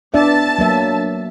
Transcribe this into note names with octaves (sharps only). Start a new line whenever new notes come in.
B3 D4 D5 E5 A5
F#3 A#3 E5